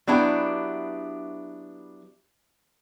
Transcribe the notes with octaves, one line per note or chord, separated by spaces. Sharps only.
F#3 B3 D4 E4 G4